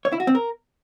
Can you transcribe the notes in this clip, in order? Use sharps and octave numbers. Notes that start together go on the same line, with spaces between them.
C#5
E4
F#4
C4
A#4